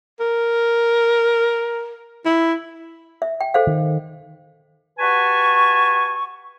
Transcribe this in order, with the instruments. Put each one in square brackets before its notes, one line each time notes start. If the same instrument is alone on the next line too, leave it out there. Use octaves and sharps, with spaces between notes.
[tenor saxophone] A#4
E4
[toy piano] E5
G5
A4 C5 F5
[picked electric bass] D#3
[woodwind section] F#4 G4 B4 G#5 A5 C#6